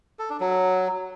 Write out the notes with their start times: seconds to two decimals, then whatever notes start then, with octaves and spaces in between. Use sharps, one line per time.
0.19 A4
0.30 D4
0.40 F#3